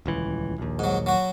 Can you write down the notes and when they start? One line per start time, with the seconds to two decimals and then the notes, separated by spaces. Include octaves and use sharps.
0.06 D#1 C#2 E3
0.58 A#1 D#2
0.79 G#2 F#3
1.06 F#3 F#4